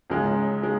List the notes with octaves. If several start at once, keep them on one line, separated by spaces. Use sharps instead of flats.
C#2 C#3 G#3
G#3